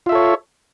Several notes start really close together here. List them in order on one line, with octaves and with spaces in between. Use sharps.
F4 E5 A4 C#5